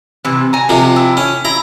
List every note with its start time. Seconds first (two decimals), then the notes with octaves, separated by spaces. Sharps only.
0.25 C3 E3
0.53 G#5 A#5
0.69 F2 C3 F3
0.96 E4
1.17 C#4
1.45 E4 A#5